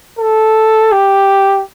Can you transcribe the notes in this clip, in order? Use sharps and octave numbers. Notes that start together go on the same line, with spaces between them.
A4
G4